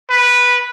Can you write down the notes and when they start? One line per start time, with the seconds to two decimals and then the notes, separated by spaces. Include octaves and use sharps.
0.10 B4